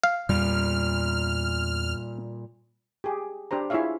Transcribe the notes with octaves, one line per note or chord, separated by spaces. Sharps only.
F5
E2 A#2 G3 F6
G4 G#4
D4 G4 C5 A#5
E4 F4 G#4 C#5 E5 F5